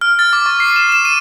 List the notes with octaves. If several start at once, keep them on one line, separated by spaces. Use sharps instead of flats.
F6
A6
D6
C#6
C7
E7
E7
D#7